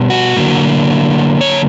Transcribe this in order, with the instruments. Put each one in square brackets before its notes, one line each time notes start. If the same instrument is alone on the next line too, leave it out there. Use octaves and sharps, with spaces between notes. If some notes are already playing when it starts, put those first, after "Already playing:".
Already playing: [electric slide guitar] B2 G3 B3
F#4
D3 F#3 A#3
C#5